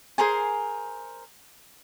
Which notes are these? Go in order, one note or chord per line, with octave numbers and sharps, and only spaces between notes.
G#4 A#4 C5 G#5